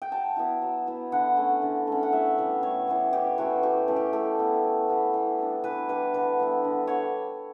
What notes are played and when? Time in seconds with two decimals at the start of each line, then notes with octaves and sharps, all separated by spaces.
0.02 G5
0.11 F#3 A5
0.37 B3 E4
0.62 F#3
0.87 B3 E4
1.12 D3 F#5
1.37 A3 C#4
1.62 D3
1.87 A3 C#4
2.03 F#5
2.12 A2 E5
2.38 E3 G3 B3
2.63 A2 C#5
2.88 E3 G3 B3
3.12 A2 G4
3.38 E3 A3 C#4 F#4
3.63 A2 G4
3.88 E3 A3 C#4
3.96 G4
4.13 A2 A4
4.38 G3 B3 E4
4.64 A2
4.89 G3 B3 E4
5.14 E3
5.39 G3 D4
5.64 E3 B4
5.89 G3 D4 B4
6.14 D3 B4
6.39 G3 B3 E4
6.64 D3
6.87 G3 C#5